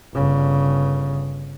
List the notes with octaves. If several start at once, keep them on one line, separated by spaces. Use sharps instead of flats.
G1 C#3